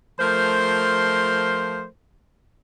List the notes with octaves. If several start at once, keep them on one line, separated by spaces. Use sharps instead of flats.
F3 A3 A#4 C5 C6